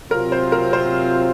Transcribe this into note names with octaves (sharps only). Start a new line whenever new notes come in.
C3 F#3 C4 F4 A#4
C5
A#4
C5